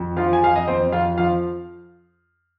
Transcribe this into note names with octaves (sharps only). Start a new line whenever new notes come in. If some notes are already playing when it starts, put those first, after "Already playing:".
Already playing: F2
F3 F4 F5
G#5
F2 F5
D#5
F2 C4 C5
F2 F4 F5
F3 F4 F5